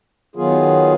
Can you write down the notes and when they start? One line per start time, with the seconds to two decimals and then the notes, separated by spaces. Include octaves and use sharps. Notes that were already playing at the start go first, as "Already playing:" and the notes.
0.36 D#3 F#3 B3 F4 G#4